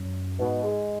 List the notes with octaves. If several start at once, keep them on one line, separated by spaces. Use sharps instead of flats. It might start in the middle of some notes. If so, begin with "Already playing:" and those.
Already playing: F#2
G#2 B2
G#3